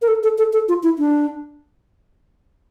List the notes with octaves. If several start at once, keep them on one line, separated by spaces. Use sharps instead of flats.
A#4
A4
A4
A4
A4
F4
E4
D4